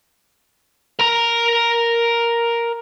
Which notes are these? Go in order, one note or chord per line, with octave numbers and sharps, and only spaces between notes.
A#4 A#5